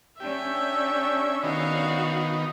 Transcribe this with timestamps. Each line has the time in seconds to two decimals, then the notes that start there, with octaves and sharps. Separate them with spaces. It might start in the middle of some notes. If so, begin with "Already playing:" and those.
0.20 C#4 D4 G4 E5
1.43 D#3 B3 D#4 F#4 F5